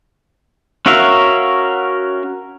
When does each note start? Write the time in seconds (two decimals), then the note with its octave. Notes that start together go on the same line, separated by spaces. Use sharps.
0.86 C#4 F#4 A#4 E5 F5